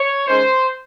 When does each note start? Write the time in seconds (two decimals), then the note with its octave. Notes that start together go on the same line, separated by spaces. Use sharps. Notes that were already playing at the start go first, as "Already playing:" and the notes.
Already playing: C#5
0.27 D#3 G#3 C#4 C5